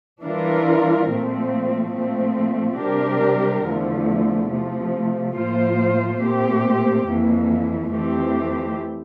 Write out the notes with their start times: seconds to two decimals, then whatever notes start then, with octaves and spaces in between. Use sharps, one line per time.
0.23 E3 G3 D4 F4 A#4
1.08 A#2 F3 A3 C4
1.94 A#2 F3 A3 C4
2.79 C3 G3 D4 G4 A#4
3.64 E2 D3 F3 A3
4.50 C3 F3 A3
5.35 A2 F3 A#3 F4 C5
6.21 A#2 A3 C4 G4
7.07 F2 E3 A#3
7.91 F2 E3 A3 C4 G4